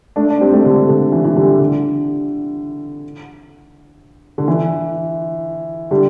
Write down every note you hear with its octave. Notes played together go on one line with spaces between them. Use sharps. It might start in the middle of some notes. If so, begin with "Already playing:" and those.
A3 D4
D4
G3 C4
A3
D3 G3
D3
E3
E3
D3 G3
D3
D3
E3
D3 G3